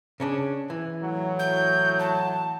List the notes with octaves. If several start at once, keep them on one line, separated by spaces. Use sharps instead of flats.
C#3 C#4 D4
E3
A2 F#3
G6
A5